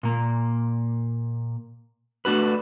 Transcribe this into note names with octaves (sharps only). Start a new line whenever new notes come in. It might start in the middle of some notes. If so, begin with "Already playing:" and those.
A#2 A#3
A3 D4 F#4 B4